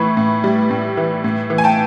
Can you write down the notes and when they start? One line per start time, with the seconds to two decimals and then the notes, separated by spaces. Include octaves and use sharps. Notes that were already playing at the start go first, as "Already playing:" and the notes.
Already playing: A2 E3 B5 C#6
0.17 A2
0.44 G3
0.71 A2
0.97 E3
1.24 A2
1.50 E3
1.58 G#5
1.64 G5 A5